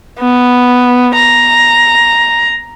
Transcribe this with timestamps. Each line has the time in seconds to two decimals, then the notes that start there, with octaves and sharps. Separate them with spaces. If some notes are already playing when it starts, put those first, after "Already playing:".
0.19 B3
1.15 A#5